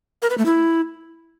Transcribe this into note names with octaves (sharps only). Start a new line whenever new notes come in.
A#4
B4
A3
E4